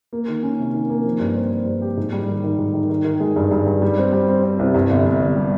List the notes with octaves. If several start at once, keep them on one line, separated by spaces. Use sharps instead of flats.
A#3
D#3
C#4
C3
D#3
A#3
F3
G2
C4
C4
G2
G4
G#2
G3
D#3
D#3
G#2
D#3
D#3
D#3
G#3
G2
G2
G2
G3
C4
G3
C4
C4
C2
G2
G1
G1
G1
G3